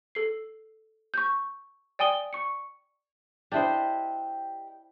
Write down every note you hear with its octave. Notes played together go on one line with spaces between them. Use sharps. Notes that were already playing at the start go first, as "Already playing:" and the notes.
A4 C7
C#6 G6
D5 G5 G#5 D#6 G7
C#6 C#7
D4 E4 G4 C5 D#5